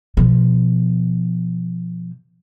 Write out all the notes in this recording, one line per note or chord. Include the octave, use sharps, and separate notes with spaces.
B2 F3